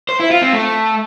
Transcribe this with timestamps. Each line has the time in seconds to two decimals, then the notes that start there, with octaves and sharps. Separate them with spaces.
0.09 C5
0.20 E4
0.31 F4
0.42 C4
0.53 A3